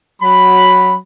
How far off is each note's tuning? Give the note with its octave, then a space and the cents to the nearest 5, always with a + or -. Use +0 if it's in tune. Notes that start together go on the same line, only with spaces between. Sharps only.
F#3 +0 B5 +0